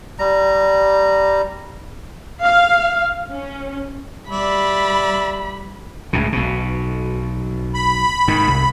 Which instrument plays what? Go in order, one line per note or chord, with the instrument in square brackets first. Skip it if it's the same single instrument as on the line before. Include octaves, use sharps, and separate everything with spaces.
[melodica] G3 A#5
[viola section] F5
C#4
[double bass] G3 [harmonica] D5 E5 [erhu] B5
[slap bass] C#2 A2 C#3
B1 B2
[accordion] B5
[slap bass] G#2 D#3
C2